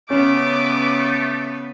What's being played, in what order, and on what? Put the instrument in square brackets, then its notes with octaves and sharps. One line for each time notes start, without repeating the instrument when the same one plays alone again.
[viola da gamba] C#3 B3 B4 [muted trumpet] A3 [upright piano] C#4 [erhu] D6